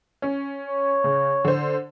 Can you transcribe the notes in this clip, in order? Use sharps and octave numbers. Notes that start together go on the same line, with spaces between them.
C#4
C#5
C#3
D3 C5